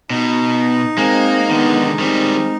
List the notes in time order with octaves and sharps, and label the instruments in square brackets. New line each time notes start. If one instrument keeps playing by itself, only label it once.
[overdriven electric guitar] B2 [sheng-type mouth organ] D#4
[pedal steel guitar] G#3 [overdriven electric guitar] A#3 [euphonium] C4
[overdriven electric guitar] D3 D#3 [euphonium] B3
[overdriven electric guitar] D#3 G3 [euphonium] C4